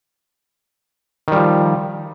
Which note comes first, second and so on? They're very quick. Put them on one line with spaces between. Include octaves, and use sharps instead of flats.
D#3 G3 F3